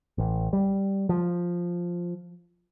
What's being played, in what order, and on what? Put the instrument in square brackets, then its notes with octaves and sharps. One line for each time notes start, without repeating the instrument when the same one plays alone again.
[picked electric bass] A1
G3
F3